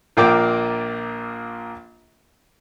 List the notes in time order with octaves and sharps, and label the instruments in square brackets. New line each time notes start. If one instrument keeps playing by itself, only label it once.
[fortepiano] A#1 A#2 A#3 G5 D6